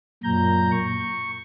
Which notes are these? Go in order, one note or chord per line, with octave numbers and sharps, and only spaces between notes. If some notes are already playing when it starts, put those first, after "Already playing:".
F#2 A#2 A#5 G6
C#6